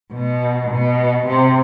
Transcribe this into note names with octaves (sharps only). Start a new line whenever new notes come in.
B2
B2
C3